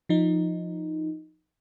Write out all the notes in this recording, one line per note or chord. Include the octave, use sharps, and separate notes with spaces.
F3 D#4